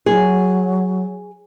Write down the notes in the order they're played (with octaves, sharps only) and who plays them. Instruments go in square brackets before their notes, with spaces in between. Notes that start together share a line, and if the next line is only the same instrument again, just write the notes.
[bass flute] F#3 [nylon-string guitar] G#4